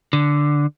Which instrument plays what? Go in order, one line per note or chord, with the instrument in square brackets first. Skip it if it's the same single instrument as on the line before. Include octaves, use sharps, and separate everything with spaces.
[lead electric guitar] D3